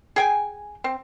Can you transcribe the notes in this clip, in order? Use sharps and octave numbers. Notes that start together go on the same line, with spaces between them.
G#4 G5 G#5
C4